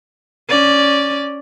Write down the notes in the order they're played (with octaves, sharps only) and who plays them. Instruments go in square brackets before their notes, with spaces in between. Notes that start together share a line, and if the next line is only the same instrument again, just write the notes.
[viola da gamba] C#4 D5